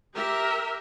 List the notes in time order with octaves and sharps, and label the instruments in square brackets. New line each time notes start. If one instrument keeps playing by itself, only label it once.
[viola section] G4 A#4 E5